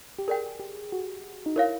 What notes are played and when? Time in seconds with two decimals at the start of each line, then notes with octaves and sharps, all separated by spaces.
0.19 G4
0.28 G#4 A#4 D5 G5
0.60 G4
0.92 F#4
1.46 D#4
1.56 E4 A#4 C#5 F5